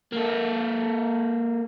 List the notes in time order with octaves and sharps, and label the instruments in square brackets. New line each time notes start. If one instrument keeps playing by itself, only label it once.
[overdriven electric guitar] A#3 A4